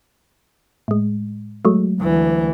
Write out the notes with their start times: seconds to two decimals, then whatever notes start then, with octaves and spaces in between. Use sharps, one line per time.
0.88 A2 G#3
1.65 F#3 G#3 A3
2.01 D2 E3